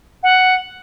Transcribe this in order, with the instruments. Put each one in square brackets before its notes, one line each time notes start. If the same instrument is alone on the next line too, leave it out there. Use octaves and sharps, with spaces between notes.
[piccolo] F#5